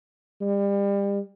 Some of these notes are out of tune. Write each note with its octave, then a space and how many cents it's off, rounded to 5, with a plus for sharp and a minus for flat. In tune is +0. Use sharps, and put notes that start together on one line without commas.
G3 +30